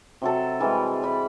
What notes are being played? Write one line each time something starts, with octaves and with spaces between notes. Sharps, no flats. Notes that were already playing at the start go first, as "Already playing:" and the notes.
C3 F#3 A4
E3 G3 G#3
D5 B5